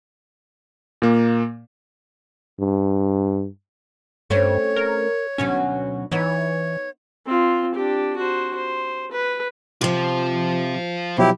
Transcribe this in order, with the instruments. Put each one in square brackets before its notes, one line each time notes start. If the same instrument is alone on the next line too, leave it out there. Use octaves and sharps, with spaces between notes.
[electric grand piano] A#2 A#3
[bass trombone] G2
[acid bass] G2 [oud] A3 C4 C#4 [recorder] C#5
[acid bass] A#4
[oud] D2 B2 F#3 [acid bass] C#4
[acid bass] E3 [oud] B3 D#4 [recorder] C#5
[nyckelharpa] C4 F4
D4 G4
F#4 C5
C5
B4
[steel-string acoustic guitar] C3 F3 [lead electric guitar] F4 C5
[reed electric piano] B2 F3 F#3 [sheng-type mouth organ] E4 G4